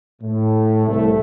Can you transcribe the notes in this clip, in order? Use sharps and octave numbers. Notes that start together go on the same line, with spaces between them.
A2
C2 A3